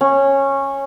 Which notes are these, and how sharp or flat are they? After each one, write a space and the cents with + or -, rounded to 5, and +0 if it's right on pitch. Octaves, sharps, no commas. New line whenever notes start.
C#4 -15